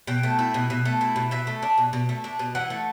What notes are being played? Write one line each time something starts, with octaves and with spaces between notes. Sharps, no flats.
B2 G5
A3
E4
B2
B2
A3
E4
B2
B2 E5
A3
D4
B2
B2
A3
D4
B2
E3 F#5
A3